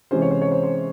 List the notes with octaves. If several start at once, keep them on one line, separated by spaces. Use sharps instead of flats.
C3 E3 G#3 C#4 C5
C#5
C5
C#5
C5
C5